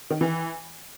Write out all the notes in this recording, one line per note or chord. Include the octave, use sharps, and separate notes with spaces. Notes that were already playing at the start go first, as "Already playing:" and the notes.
D#3
E3